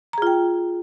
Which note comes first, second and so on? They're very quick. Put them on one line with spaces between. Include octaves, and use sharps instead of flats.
A#5 G#4 F4 G5